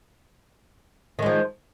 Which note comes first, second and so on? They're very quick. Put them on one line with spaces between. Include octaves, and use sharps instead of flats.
D#3 G#3 F3